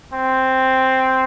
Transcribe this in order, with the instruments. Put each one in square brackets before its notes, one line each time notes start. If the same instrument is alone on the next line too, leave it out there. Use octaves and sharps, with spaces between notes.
[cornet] C4